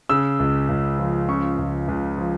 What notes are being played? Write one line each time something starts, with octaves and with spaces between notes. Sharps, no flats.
C#3 E6
C#2
C#2
F3
C#3 C#6
C#2
C#2
F3